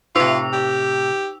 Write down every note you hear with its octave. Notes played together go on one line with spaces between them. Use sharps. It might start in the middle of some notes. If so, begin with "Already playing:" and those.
A2 C3 D#4 F4 E6 F7
G4